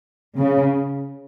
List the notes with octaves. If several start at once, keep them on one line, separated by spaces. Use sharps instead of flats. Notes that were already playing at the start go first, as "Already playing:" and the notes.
C#3